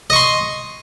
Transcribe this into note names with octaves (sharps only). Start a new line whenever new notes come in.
D#5 C6 C#6